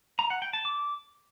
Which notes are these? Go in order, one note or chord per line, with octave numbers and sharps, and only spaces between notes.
A#5
F#5
G5
A5
D6